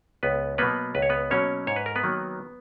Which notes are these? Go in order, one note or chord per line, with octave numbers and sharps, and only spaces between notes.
C#2 B3 B4
B2 F#3 A#3 B3 B4
C#2 B4
C#5
B3 B4
B2 F#3 A#3 C#4 C#5
G#2 C#5
B4
A#4
B3 B4
D#3 F#3 A#3